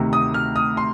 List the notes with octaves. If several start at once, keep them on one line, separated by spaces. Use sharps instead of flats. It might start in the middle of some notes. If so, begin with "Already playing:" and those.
Already playing: D2 C3 D#3
D#6
F6
D#6
C6